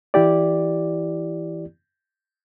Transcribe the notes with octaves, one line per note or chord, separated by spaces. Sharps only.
E3 E4 G4 D5